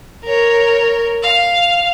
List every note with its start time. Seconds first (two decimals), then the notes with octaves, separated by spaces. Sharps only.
0.24 A#4 C#5
1.22 F5